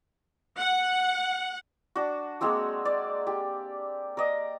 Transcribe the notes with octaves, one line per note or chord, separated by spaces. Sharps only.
F#5
D4 F#4
G#3 A#3 C4 F#4
D5
G4
A#4 D5 D#5